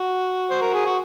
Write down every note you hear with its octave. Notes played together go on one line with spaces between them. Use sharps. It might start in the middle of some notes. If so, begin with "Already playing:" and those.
Already playing: F#4
C5
A#4
G#4
F#4